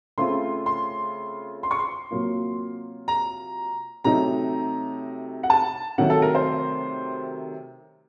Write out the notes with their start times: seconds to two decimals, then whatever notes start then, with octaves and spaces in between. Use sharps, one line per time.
0.18 C#3 A3 C4 F4 C6
0.66 C6
1.63 C6
1.71 C#6
1.79 C6
2.11 C3 F#3 A#3 F4
3.08 A#5
4.04 C3 F#3 A3 D#4 A#5
5.43 F#5
5.50 A5
5.98 C3 D#3 F#3 A3 F#5
6.10 A4
6.22 A#4
6.35 C5